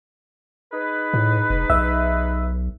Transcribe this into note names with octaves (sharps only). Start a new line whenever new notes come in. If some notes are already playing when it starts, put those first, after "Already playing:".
D#4 G#4 B4
A2
F1
B1 E5